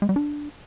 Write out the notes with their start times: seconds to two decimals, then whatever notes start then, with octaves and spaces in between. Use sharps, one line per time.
0.02 G#3
0.09 G3
0.16 D4